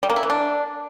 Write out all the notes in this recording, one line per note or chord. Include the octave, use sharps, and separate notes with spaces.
G3
A#3
E4
E3
D4